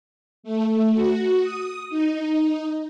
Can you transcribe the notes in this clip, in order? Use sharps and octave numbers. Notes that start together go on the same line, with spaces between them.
A3
F#4
D#6
D#4